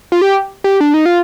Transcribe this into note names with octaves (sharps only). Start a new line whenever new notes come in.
F4
G4
G4
D4
D#4
F4